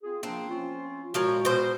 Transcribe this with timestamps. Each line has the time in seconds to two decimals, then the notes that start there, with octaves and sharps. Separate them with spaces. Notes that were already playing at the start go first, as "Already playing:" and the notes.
0.03 C4 F4 G#4
0.23 F3 A#3 C4 D4
0.49 F3 C#4 F4
1.14 A#2 F3 G#3 F#4 A#4 C#5
1.45 B2 C5